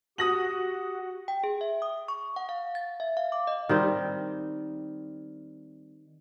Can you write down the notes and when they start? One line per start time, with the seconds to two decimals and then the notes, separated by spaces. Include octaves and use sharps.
0.18 F#4 G4 F#5 D#6 A#6 F#7
1.28 G5
1.44 G#4
1.61 E5
1.82 D#6
2.08 C#6
2.36 F#5
2.49 F5
2.75 A6
3.00 E5
3.17 F5
3.32 D6
3.47 D#5
3.69 D#3 G3 C4